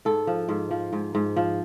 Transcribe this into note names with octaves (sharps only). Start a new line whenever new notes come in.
G#2 A4
F3
G#2
F3
G#2
G#2
F3